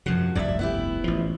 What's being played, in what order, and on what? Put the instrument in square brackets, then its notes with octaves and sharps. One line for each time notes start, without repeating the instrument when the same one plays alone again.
[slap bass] F#2 C3 [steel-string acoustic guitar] F3 F#4
[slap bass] F1 C2 G2 [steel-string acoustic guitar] D5 E5
[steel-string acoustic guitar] B3 E4 G4
[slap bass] A1 F3